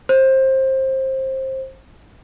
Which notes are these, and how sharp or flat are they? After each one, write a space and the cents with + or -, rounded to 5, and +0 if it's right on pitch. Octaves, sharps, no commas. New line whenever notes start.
C5 +20